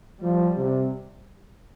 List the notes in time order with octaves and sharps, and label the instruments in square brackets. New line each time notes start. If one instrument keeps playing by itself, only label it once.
[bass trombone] F3 [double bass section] G3
[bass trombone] C3